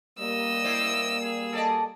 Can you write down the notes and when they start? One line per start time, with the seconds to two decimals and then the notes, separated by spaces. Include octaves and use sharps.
0.19 G3 A#3 D#5 E6
0.64 E4 C5 D5
1.21 G#4
1.53 A4 D5 D#5